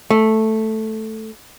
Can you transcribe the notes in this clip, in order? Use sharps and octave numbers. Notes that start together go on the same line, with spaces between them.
A3